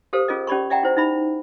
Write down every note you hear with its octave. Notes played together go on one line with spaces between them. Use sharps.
G4 A4 A#4 C5 F5
C#4 F4 G#4 A#4 D#5
C#4 G4 D5 B5 C#6
D5 E5 F#5 G5 A#5
E4 C5
D#4 E4 E5 B5